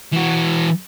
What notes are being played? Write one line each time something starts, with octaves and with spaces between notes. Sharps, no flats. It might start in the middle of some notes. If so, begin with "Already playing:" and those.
E3 F#4